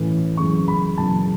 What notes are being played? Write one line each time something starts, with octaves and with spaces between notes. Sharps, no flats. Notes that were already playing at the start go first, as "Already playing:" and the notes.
Already playing: A2 E3 A3 C#4
F#2 C#3 E3 G#3 C#6
B5
F#2 C#3 E3 G#3 A5